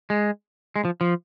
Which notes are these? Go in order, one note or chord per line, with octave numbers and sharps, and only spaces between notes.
G#3
G#3
F3
F3